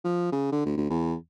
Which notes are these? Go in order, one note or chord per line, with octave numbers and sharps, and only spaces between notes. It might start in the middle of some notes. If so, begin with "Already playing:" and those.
F3
C#3
D3
D2
D2
E2